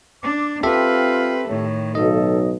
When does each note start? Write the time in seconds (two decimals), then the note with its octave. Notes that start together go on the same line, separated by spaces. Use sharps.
0.23 D4 D6
0.63 C4 F4 G4 A4 B4 E5
1.48 A2 D#3 C#5
1.95 B1 A4 D#5